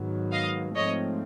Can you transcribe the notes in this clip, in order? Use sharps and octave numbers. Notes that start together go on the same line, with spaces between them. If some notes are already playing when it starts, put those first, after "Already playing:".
Already playing: G#2 D#3 F#3 B3
D#5 F5
G#2 F3 A3 C4 C#5 D#5